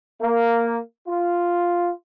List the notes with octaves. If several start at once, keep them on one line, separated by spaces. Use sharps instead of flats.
A#3
F4